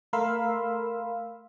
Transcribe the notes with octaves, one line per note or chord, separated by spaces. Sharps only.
A3 A#4 F5 B5 C6 E6